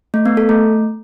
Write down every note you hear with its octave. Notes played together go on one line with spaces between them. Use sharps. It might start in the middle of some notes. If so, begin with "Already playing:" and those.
A3
B3
A4
A3